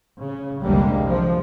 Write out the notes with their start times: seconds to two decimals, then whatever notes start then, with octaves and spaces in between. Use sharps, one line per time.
0.22 C#3
0.63 F1 C2 D3 G3 G#3 A#3
1.06 F3